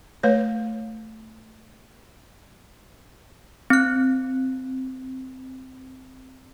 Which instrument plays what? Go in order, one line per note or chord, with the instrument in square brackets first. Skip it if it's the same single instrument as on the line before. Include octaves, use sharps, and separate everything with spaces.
[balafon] A3 B4 C#5
[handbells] C4 F#6